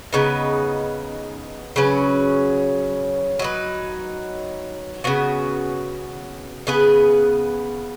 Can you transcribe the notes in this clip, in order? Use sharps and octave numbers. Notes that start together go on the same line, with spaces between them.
C#3 B3 D#4 B4
C#3 F#3 C#4 B4
F#3 D#4 B4
C#3 B3 F#4
C#3 B3 G#4 B4